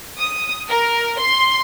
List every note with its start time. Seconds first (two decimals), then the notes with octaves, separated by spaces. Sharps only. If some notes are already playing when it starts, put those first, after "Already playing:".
0.19 D#6
0.69 A#4
1.20 C6